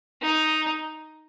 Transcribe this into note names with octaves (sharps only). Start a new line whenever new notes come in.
D#4